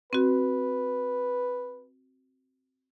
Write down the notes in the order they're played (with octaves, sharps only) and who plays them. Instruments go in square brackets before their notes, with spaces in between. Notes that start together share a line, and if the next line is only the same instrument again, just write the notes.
[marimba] C4 F#4 [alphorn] B4